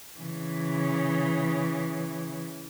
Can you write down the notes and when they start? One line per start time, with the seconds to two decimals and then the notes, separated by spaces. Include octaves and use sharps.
0.19 C#3 E3